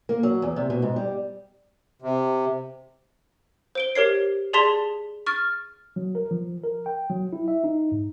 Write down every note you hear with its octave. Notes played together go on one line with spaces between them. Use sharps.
A#3
F#3
E2
C3
B2
G#2
G3
C3
C5 D7 G7
G4 A#4 C#5 C7
G#4 D5 A5 C6 B6 F7
C#6 F6 A6
F#3
A#4
F3
A#4
G5
F#3
E4
E5
D#4
G#2